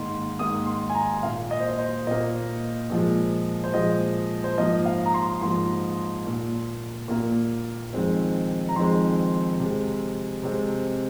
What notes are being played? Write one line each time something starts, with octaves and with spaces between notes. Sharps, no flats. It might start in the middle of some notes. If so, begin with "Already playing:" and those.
Already playing: G#2 D#3 A#3 C6
G#2 D#3 A#3 D#6
C6
G#5
A#5
A#2 A#3 F5
D#5
C5
D#5
C5
A#2 A#3 D#5
A#2 F3 G#3
C5
A#2 F3 G#3 D#5
C5
G#2 F3 A#3 D#5
F5
A#5
C6
G#2 F3 A#3 C6
A#2 A#3
A#2 A#3
F2 D#3 G#3 C4
A#5
F2 D#3 G#3 C4 C6
C3 G#3 C4
C3 G#3 C4